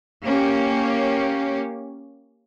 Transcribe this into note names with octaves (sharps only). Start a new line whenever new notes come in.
A#3 C#4 G4